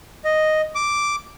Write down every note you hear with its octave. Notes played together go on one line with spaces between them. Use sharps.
D#5
D6